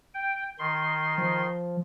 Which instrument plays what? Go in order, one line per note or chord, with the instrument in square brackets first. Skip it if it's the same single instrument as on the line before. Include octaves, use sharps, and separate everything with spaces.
[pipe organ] G5
D#3 C6
[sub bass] F3